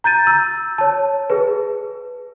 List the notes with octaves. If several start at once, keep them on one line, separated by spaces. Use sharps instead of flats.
A#5 G6 A6 D#7
E6
C#5 A5
G#4 B4